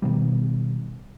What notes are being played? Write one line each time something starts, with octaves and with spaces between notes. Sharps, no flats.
B2 D#3 G3